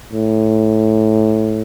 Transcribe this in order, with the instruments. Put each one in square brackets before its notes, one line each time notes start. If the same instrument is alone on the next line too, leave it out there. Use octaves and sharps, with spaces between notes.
[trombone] A2